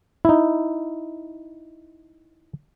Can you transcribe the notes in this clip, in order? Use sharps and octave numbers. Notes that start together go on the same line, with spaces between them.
D#4 E4